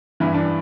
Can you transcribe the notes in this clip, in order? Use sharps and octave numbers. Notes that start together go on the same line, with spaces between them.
G2 E3 E4
D4